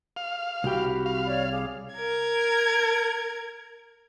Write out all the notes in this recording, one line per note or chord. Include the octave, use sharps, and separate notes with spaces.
F5
C2 F#4 G4 B5
F5
C#5 D5
G#4 F5 D6
A#4 G#6